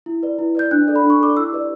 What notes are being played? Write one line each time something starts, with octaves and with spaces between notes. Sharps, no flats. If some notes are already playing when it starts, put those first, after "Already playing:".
E4
B4 D5
E4
B4 D5 G6
D4 F#6
A4 D5
B5
D4
C#6
A4 D5 D6
E4 E6
G4 B4 D5